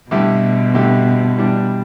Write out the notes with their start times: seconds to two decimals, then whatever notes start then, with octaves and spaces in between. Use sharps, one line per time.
0.10 G2 B2 D3 A3 E4 G4
0.74 G2 D3 A3 E4 G4
1.37 E3 G3 D4